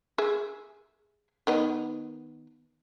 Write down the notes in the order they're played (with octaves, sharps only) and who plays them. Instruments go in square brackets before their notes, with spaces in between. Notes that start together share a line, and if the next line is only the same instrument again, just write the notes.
[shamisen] G#4 E5
D#3 B3 D#5